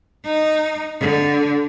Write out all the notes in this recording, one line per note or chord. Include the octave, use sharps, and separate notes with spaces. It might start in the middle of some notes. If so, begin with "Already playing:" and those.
D#4
D3